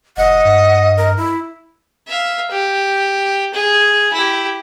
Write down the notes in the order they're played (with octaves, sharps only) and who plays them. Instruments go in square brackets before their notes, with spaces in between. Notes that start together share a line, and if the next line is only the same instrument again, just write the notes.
[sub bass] F1 [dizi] D#5 [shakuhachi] F#5
[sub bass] G2
[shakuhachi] A#4
E4
[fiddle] E5 F5
G4
G#4
E4 G4